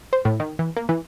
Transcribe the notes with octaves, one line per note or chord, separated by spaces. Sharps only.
C5
A2
D#3
E3
A#3
E3